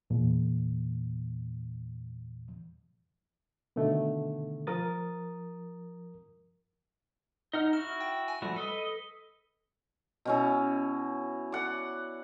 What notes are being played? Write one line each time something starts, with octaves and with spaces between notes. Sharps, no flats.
E2 A#2
B2 D3 D#3 A3
F3 A#4 D#6 A6
D#4 D#5 F#5 F6
E4 F#4 F6
G5
G#5
F3 G3 A3 F#4
A4 B4 D#5
B2 C#4 E4
D5 F#5